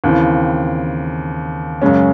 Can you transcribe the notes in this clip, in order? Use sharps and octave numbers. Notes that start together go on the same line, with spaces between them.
D#2 C#3 E3 C4
F#2 C#3 G#3 C#4